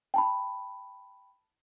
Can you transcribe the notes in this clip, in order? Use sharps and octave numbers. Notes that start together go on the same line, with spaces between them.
G5 A5 B5